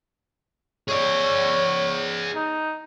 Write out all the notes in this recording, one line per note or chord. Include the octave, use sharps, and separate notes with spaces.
G#4 C#5 D5
D#4